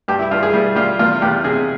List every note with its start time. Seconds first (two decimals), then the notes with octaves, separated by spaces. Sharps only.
0.08 G2 G4
0.19 E4
0.31 G2 F4
0.43 G#4
0.53 G3 E4
0.76 G3 F4
0.99 E2 F4
1.22 E2 G4
1.44 C3 G#4